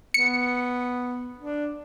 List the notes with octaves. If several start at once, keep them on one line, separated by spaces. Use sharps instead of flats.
B3 C#7
D4